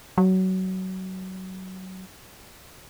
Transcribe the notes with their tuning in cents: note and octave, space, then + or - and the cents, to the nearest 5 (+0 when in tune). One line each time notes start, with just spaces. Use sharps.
F#3 +20